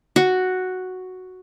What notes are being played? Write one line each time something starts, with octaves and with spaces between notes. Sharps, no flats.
F#4